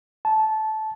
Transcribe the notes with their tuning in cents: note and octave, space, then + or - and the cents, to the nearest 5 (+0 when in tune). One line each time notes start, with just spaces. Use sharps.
A5 -15